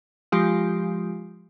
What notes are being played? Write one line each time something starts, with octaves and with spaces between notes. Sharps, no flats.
F3 G#3 F4 G4